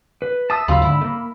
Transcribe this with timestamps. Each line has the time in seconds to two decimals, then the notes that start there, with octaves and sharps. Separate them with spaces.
0.22 B4
0.50 E5 A5 D#6 E6
0.68 D#2 C#3 F#3 F4 B5 E6
0.82 G#2 D3 E4
1.01 A3 A#3